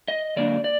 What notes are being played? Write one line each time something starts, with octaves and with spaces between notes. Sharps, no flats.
D#5
D3 F#3 A#3 D4 D5
D5